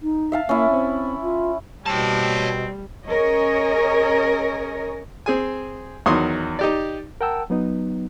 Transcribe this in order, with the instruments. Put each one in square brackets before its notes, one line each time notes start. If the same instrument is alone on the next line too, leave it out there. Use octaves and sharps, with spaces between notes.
[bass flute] D#4
[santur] E5 F5 A5
[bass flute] A#3 [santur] C#4 E4
[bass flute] C4
F4
[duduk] B2 [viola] G3 [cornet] C4 [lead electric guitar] C#5 A5
[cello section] C#4 G#4 A#4 C#5 D#5
[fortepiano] C4 G#4 G#5
E2 D#3 F#3 C6 C#6 D#6
D#4 G4 D5
[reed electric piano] A#4 F#5 G5 A5 E6
F#3 B3 D#4